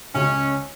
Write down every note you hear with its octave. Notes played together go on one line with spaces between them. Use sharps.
C#2 C#3 G#3 C#4